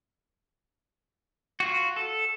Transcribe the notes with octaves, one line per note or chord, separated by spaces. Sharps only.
F4 F#4
A4